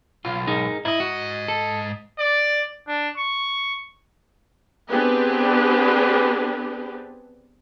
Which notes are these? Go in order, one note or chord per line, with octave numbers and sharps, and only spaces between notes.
B1 F4
D#4 G#4 A#4
G#2 E4 D#5
F#4
A4
D5
D4
C#6
B3 C4 D4 G4 G#4 B4